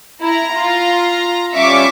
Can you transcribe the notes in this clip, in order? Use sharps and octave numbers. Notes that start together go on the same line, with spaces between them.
E4 A#5
F4
G3 C#4 F4 E5 C#6 D6